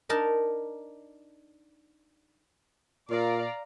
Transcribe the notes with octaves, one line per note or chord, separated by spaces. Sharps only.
D4 D#4 A#4 A5
A#2 D5 F5 A#5